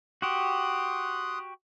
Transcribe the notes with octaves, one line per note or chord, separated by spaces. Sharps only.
F#4 G4 C6 D#6 F#6